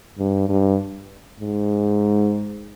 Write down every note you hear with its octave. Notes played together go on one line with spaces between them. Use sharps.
G2
G2
G#2